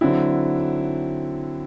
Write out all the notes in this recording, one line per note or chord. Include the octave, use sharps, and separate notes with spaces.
D3 F#3 C4 E4